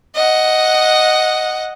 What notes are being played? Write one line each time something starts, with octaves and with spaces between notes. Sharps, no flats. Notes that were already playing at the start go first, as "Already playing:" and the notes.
D#5 F#5